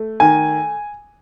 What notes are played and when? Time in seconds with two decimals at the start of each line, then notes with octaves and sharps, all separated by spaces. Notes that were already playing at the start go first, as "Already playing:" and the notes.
Already playing: A3
0.20 D#3 G#5